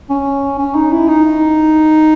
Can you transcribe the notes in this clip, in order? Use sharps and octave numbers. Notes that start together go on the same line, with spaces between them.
C#4
C#4
D#4
E4
D#4